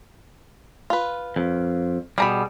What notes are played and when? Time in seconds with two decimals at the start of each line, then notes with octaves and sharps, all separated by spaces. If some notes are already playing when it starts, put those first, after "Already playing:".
0.90 F4 B4
1.36 F2
2.18 B2 G3 G#4 A#5 B5